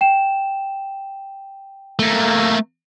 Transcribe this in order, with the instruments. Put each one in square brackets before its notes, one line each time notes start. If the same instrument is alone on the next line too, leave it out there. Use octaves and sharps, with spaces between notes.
[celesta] G5 E7
[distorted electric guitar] A3 A#3